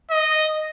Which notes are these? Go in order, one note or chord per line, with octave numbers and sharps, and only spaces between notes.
D#5